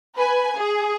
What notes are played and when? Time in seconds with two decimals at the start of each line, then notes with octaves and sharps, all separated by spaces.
0.17 B4 G#5
0.57 G#4